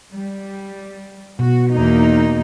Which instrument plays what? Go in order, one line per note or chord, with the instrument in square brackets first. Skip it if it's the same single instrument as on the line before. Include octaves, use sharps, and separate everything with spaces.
[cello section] G3
[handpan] B2 [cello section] F#4
[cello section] E2 A#3 D#4